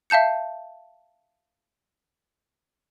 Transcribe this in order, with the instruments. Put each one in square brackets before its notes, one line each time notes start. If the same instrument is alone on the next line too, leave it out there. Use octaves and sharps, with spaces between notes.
[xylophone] E5 F5 A5 G6 C#7